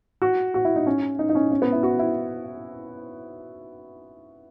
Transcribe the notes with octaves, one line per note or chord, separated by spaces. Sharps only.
F#4
F#4
E4
D#4
C#4
D#4
D#4
C#4
C#4
B3
E4
F#4
E4